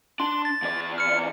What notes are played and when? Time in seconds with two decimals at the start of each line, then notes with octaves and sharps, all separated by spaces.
0.20 D4 C6
0.45 A6
0.62 E2 D5
0.98 F6 C#7